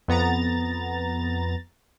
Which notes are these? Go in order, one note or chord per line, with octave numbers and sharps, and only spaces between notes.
F2 B3 A#5 A6